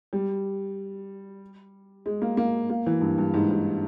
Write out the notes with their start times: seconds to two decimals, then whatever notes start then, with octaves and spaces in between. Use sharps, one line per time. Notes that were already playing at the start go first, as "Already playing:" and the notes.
0.13 G3
2.06 G#3
2.22 A#3
2.37 A#3
2.70 A#3
2.86 E3
3.01 G2
3.18 G2
3.34 G#2
3.51 G#2